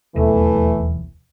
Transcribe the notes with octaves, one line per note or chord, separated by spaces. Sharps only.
D#1 B1 E2 E3 A3